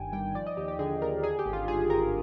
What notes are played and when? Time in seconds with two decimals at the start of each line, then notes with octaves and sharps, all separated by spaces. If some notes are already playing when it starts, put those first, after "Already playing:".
Already playing: G1 G2 D#3 G5 G#5
0.13 G3 G5
0.35 F3 D5
0.46 D#5
0.57 D#2 G4
0.68 G4
0.79 D3 G#4
1.02 D#2 A#4
1.23 D3 G#4
1.39 G4
1.46 G#1
1.53 F4
1.68 G2 G#4
1.90 G#1 A#4